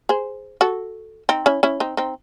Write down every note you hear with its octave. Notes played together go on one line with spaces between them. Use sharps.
G#4 C5
F#4 A4
C4 D#4
C#4 E4
C#4 E4
C4 D#4
C4 D#4